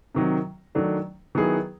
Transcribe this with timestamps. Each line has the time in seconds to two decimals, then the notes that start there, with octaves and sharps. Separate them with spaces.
0.15 C3 D#3 F#3
0.75 D#3 F#3 A3 D4
1.35 D#3 F#3 B3 E4 G#4